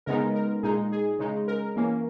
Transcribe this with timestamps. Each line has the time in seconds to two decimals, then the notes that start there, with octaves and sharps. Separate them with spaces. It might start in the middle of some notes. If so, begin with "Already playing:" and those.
0.06 C#3 G#3 B3 D#4 A#4
0.35 A#4
0.63 A#2 G#3 D#4 G#4
0.92 G#4
1.19 C#3 G#3 D#4
1.48 A#4
1.76 E3 A#3 C#4